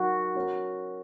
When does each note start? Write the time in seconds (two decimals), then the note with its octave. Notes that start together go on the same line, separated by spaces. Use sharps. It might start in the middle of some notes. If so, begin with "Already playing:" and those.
Already playing: F#3 D#4 F#4 A#4
0.35 F#3 C#4 A#4 C#5